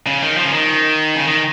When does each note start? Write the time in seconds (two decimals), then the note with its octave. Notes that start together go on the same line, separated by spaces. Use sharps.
0.07 C#3
0.23 D#3
0.37 F3
0.45 C#3
0.52 D#3
1.15 C#3
1.25 D#3